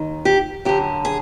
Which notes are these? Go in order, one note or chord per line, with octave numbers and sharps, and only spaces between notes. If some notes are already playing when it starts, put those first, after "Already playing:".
Already playing: D#2 D#3
G4
F#2 D3 G4
G#4